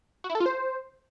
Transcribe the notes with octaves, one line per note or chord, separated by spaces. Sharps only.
F#4
E4
A4
F4
C5